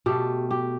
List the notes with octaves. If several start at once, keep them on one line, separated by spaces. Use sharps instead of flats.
B2 A3 G4
G4